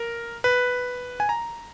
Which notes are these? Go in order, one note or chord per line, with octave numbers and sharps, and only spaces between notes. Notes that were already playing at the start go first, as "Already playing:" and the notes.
Already playing: A#4
B4
G#5
A#5